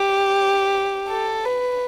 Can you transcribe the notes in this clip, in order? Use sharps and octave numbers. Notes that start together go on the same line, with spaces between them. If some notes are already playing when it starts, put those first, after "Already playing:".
Already playing: G4
A4
B4